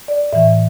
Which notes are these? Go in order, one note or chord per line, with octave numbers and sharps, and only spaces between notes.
D5
A2 E3 E5